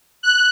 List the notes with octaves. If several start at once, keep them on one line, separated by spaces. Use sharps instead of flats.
F#6